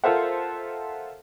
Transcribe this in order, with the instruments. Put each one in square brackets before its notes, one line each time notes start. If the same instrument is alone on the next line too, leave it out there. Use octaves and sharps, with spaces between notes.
[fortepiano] F4 A4 A#4 C5 E5 F#5